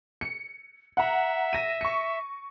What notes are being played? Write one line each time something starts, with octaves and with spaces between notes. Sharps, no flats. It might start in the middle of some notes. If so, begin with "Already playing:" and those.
C#7
E5 F#5 A#5
A#6 D#7
C#6 C#7